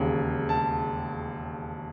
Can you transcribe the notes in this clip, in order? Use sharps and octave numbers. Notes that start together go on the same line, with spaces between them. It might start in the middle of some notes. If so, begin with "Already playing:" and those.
Already playing: E1 D#2 C#3
A5